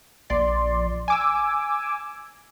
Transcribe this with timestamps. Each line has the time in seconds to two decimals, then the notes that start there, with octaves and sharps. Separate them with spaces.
0.30 A#1 D5 C6
1.08 G#5 D6 E6